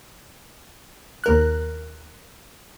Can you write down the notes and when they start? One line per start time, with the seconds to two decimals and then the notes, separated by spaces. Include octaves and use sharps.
1.24 D#2 A#4 F#6